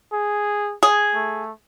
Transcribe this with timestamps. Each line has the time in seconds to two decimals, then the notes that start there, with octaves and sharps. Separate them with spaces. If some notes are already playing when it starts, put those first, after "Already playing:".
0.13 G#4
0.83 G#4
1.15 A3